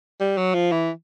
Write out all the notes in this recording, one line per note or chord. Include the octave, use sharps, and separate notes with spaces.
G3
F#3
F3
E3